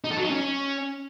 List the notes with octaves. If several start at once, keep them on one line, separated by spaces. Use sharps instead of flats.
D#4
A4
F#3
D#4
C#4